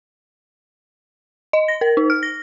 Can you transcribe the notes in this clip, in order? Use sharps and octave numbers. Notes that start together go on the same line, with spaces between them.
D#5
A#6
A#4
D#4
F6
A#6